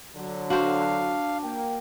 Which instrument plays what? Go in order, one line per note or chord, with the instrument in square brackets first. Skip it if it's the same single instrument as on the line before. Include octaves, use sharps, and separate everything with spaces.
[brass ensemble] D3 F#3
[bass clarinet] D4 [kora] F#4 C5 [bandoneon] F5
[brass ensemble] A#3 G5